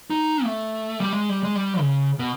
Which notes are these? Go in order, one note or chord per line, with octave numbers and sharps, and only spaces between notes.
D#4
A3
G3
G#3
G3
G#3
G3
C#3
B2